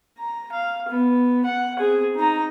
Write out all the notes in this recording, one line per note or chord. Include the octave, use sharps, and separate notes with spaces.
A#5
F5
B3
F#5
C4 G#4
D#4 A#5